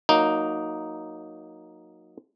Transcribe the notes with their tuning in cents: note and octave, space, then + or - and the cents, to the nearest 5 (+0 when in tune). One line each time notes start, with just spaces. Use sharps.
F#3 -15 A#3 +0 D#4 +0